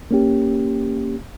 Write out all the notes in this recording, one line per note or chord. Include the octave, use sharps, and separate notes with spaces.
A#3 C#4 G4